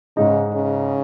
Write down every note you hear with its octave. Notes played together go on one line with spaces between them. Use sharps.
G#2 C#3 G#3 D#4
C#3